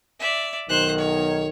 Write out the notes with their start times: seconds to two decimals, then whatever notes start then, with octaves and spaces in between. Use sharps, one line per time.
0.20 D5 E5
0.69 B1 D#3 C5 F#6
0.98 C#5